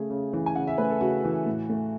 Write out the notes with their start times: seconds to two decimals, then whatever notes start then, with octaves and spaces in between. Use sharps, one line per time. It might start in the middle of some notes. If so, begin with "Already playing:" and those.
Already playing: C#3 A3 G#4
0.10 C#3
0.33 E3
0.46 G#5
0.55 C#3 F#5
0.67 E5
0.78 A3 B4
0.90 A4
1.01 C#3 F#4
1.24 E3
1.46 A2
1.69 A3